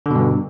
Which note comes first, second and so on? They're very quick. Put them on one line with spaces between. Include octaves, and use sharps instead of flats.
D3 B2 G2